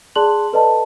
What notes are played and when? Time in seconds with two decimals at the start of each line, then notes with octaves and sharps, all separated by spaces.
0.16 G#4 D5 A5 C6 F#6 F#7
0.53 A4 B4 D5 D#5 A5